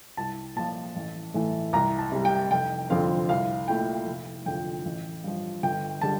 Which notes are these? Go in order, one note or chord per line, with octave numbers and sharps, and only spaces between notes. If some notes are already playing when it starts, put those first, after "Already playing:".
C2 A5
A#2 F3 A5
A1
A2 E3 A3
C2 A#5
A5
C3 G3
G5
F1 G5
F2 D3 F3 C4 F5
C2 F5
A#2 A3 E4 G5
F1
F2 D3 F3 G5
A1
G2 F3
G1 G5
D3 G3 A5